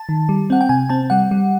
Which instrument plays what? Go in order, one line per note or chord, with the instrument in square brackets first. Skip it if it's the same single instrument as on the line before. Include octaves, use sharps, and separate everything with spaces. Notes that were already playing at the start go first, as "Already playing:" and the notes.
Already playing: [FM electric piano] A5
D#3
G3
C4 F#5
G5
C3 G#5
C4 A5
G3 F#5
G3